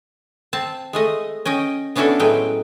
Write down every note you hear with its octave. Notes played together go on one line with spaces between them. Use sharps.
C4 A5
G#3 A3 D#5
C#4 D#5 G5
B3 C#4 D4 E4 F#4 A4
A2 F#3 G#3 C#4 B4 G5